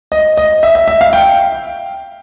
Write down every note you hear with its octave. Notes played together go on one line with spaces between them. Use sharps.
D#5
D#5
E5
E5
E5
F5
G5